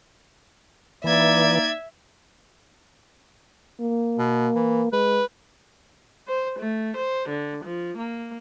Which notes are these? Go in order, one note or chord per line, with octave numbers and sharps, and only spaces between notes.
E3 A#3 D#4 D5 E5 G#6
A#3
B2
E3
G#3 B4
C5
A3
C5
D3
F3
A#3